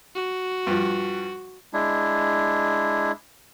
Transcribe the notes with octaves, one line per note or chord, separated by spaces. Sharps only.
F#4
G2 F3
G#3 D4 E4